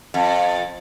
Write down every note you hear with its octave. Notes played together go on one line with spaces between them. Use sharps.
F2